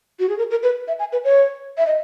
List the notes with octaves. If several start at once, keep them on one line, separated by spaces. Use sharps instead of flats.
F#4
G#4
A#4
A#4
B4
E5
G#5
B4
C#5
E5
D#5